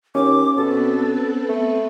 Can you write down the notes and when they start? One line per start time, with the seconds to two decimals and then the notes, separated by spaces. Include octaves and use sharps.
0.15 D#2 C#4 D6
0.57 B2 B3 C4 A4 B4
1.49 A3